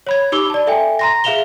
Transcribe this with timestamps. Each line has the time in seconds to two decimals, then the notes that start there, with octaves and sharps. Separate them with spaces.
0.07 C#5 B5 G#6
0.32 D#4 G4 B5 D6 E6 G7
0.50 D5 A5
0.67 A4 E5 G5 G#5
0.99 A#5 C6 A#6
1.24 G#4 E5 F5 E7 F7 G7